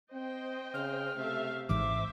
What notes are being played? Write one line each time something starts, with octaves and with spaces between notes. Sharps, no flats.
C4 C5 D#5 G5
C#3 F6
C3 A3 E5 F5
G#1 G#2 E3 C5 E5 D6